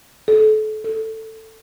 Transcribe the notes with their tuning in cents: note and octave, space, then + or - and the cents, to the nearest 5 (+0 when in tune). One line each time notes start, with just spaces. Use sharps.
A4 -30
A4 +10